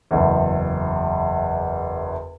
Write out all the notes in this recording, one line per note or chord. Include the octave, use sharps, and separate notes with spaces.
F#1 E2